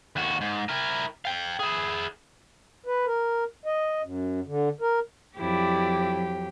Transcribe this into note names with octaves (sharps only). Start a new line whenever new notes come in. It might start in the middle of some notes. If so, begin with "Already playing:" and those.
D#2 F#4
G#2
E4 A#4
F5 G5
E4 G#4
B4
A#4
D#5
F#2
D3
A#4
F2 F#3 E4 G4 D5